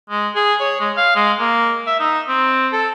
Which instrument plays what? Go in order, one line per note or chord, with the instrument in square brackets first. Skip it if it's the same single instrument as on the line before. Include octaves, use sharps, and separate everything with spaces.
[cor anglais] G#3
G#4
C#5
G#3
F5
G#3
A#3
E5
D#4
C4
A4